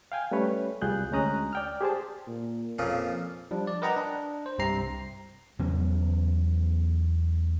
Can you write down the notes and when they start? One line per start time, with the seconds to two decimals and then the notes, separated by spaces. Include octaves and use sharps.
0.12 F5 G5 G#5
0.31 G3 A3 C#4 B4 C#5
0.82 C2 G3 F4 G#4 F#6 G6
1.11 D2 G#3 C#4 A#5 D#6 F#6
1.53 D5 G5 F6
1.81 G4 G#4 C5 A5
2.27 A#2
2.79 F2 A#2 C#3 F3
3.51 F3 G3 D4
3.67 D5
3.82 A#4 B4 D#5 F#5 G5 A#5
3.96 D4
4.46 C5
4.58 C2 G2 C3 C4 A#5 C7
5.59 E2 C#3 F#3 B3